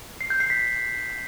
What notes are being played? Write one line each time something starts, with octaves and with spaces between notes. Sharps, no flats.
C7
G6
C7
B6